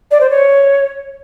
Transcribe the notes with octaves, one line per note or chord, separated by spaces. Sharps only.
D5
C5
C#5